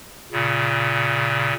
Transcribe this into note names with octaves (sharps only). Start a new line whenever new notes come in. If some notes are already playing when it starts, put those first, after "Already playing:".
A#2 C#3